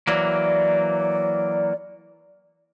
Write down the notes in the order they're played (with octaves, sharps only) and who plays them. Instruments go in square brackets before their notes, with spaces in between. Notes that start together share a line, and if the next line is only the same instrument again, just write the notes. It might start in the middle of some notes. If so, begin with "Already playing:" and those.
[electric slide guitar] E3 F#3 A#3 [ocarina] D5